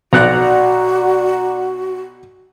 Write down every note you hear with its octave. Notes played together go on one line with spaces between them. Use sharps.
B1 F#4 D5 F#5 A#5 F#6